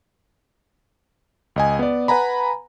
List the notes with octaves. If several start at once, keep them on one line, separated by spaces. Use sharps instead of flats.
C#2 D#5 G#5
B3 D5
B4 F#5 G#5 A#5 B5